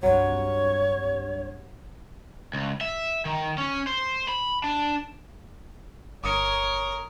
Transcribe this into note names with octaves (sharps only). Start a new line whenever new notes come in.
C2 G2 F#3 C#5
C#2
E5
D#3
C#4
C5
B5
D4
G1 A#4 C#5 D6 D#6 C#7